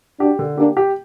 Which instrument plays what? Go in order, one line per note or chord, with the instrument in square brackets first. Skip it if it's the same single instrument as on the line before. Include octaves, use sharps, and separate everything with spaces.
[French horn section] D4 F#4 [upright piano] G4
[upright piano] D3
[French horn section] A#3 D4 [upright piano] G4
[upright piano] G4